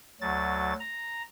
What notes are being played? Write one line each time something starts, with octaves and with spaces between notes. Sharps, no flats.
D2 F#3 A6
A#5